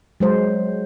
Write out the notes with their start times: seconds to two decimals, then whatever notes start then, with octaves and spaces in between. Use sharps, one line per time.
0.20 F#3 G#3 C5